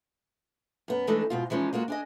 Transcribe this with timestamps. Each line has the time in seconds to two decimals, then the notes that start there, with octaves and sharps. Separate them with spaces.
0.88 F#2 B3
1.07 E3 G#3 A3 D4 D#4 A4
1.30 G#2 B2 F4
1.50 E3 F3 G#3 C#4 D#4
1.73 G#3 A#3 F4 F#4
1.88 D4 G#4 D#5